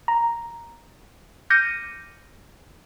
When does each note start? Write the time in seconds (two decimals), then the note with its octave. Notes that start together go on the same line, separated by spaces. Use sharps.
0.08 A#5
1.50 D6 F6 G6 A#6 C#7 D#7